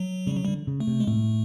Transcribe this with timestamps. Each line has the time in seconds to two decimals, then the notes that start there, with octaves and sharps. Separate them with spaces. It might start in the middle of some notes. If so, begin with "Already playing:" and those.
Already playing: F#3
0.27 C#3 G3
0.36 F#3
0.45 D3 G3
0.67 C#3
0.80 A3
0.87 C3
1.00 G#3
1.07 A2 A3